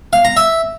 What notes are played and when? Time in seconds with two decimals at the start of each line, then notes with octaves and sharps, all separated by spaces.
0.13 F5
0.25 A#5
0.36 E5